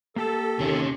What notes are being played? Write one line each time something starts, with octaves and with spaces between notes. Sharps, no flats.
A#3 G4 A4 A5
D#2 C3 C#4